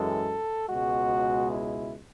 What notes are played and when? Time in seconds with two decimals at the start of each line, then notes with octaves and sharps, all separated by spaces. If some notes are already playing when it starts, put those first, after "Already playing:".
Already playing: F#2 E3 G#3 A4
0.69 C#2 B2 G#3 F#4
1.50 E4